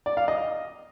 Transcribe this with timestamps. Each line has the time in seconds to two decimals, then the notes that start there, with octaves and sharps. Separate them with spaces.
0.06 D5
0.17 F5
0.28 D#5